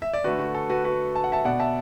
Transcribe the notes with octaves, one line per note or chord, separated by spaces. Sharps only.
E5
D5
D3 A3 F#4 B4
F#4
A4
F#4 B4
F#4 B4
A5
F#5
E5 A5
B2 B3 D5 F#5
E5 A5